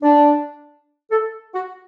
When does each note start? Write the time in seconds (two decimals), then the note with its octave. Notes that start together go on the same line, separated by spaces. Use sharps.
0.03 D4
1.10 A4
1.54 F#4